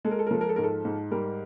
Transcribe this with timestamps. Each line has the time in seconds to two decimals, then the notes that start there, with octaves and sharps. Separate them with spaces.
0.05 G#3 A4
0.11 A#4
0.19 A4
0.27 A#4
0.31 F3 A4
0.41 A#4
0.49 A4
0.56 G#2 A#4
0.63 A4
0.85 G#2
1.11 G3 A#4